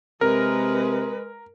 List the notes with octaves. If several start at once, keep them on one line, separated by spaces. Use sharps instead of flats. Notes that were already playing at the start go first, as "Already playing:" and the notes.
C3 G#3 A#4 B4